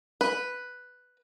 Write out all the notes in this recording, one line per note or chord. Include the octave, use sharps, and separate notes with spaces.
B4